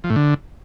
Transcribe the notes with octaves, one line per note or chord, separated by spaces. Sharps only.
F3
A2
D3